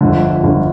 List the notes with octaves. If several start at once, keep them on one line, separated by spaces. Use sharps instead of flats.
G1 F2 D3
G1 F2 D3